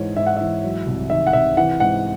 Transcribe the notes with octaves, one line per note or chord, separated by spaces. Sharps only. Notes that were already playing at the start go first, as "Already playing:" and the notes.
Already playing: G#2 E3 C#5
G#2 E5
F#5
E3 E5
F#3
C2
D#3 E5
F#5
C3 E5
E3 F#5
G#2 F#5